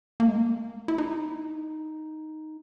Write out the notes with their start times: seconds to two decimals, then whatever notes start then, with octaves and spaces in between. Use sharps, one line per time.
0.20 A#3
0.28 G#3
0.37 A#3
0.88 E4
0.98 D#4